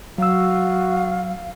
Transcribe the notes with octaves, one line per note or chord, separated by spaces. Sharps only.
F#3 F#4 F5 E6